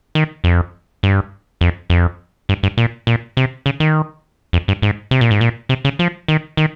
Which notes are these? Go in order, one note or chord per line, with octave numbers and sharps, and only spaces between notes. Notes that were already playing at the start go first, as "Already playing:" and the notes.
D#3
F2
G2
F2
F2
G2
G2
A#2
A#2
C3
C#3
D#3
F2
G2
G#2
C3
A#2
G#2
A#2
C3
C#3
F3
D#3
D#3